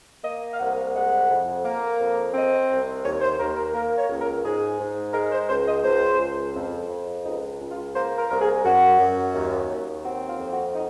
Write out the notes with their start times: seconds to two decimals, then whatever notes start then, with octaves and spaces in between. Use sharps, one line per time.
0.24 A#3 D#5
0.53 F5
0.59 C2 F#5
0.94 G#3 F#5
1.29 F2
1.64 A#3
2.00 F2
2.34 C4 D#5
2.69 C2
3.05 D#2 C#5
3.22 C5
3.39 D#2 A#4
3.57 A#4
3.74 A#3 A#4
3.97 C#5
4.09 C#2
4.21 A#4
4.44 G#2 G#4
4.79 G#2
5.14 G#3 A#4
5.32 C5
5.49 C#2 C5
5.67 D#5
5.84 C#2 C5
6.19 C#2
6.54 F2
6.89 F2
7.24 C#2 D#4
7.60 C#2
7.71 F4
7.95 A#3 C5
8.17 A#4
8.29 C2 A#4
8.41 G#4
8.64 F#2 F#4
8.99 F#2
9.34 D#2
9.69 D#2
10.04 C4 F#4
10.28 F4
10.39 F2
10.52 F#4
10.74 D#4